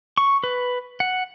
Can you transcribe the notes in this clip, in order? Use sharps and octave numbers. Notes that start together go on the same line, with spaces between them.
C#6
B4
F#5